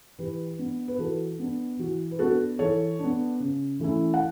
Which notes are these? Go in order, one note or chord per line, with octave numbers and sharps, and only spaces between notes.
E3 G4 B4
B3 D4
B4
E3 F#4 A4
B3 D4
E3 F#4
B4
B3 D4 F#4 A4
E3 A4 C#5
B3 D4
C#3
E3 A3 C#4 E4
F#5